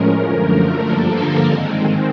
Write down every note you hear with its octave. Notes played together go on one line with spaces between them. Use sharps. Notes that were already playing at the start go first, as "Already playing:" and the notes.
Already playing: A2 F3 G#3 C#4 A#4
F#2 D3 F3 A3
G2 D3 F3 A#3 A4
A#4
G#2 D#3 G#3 C4